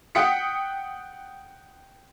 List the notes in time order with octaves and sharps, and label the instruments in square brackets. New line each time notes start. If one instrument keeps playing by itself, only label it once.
[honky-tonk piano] F#5 G5 D#6 B6 C#7